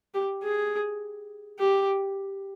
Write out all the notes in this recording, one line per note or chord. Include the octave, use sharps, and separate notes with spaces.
G4
G#4
G4